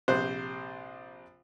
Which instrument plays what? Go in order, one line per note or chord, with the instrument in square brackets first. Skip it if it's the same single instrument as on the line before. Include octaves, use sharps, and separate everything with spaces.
[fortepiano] A#1 C3 C5 F#6